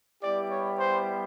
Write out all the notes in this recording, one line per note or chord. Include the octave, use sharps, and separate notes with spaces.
G3 B3 E4 G4 D5
C#5
C5